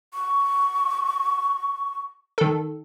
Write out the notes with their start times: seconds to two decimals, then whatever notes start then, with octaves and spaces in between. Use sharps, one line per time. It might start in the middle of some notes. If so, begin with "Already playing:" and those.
0.14 C#6
2.38 D#3 A4